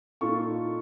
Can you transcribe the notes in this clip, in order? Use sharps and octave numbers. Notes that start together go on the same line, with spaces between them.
A#2 D#4 F4 A4 C#6